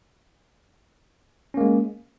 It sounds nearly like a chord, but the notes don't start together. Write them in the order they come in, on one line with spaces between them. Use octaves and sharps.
C#4 A#3 G#3